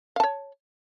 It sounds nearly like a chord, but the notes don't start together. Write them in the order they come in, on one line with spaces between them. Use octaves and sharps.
F5 A5 C#5